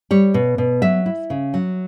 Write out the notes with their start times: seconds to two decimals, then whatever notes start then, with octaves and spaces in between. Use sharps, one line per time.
0.11 G3 C#5
0.34 B2
0.58 B2
0.82 F#3 E5
1.06 E4
1.30 C#3
1.54 F#3